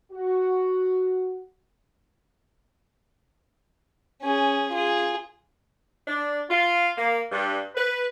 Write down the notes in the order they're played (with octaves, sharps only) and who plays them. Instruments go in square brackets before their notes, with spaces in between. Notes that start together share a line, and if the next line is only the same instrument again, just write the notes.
[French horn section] F#4
[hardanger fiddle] C#4 G#4
F4 G#4
[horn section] D4
F4
A#3
G2
B4